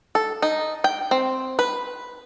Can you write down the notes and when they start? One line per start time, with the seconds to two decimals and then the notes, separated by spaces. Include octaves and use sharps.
0.15 A4
0.42 D#4
0.84 G5
1.11 C4
1.59 B4